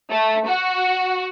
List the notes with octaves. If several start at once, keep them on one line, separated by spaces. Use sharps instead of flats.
A3
F#4